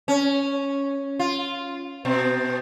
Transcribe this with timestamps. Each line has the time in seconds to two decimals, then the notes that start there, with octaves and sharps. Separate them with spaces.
0.08 C#4
1.19 F4
2.05 B2 C4